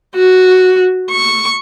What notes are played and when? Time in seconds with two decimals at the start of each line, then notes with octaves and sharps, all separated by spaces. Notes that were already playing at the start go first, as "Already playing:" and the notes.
0.15 F#4
1.10 C#6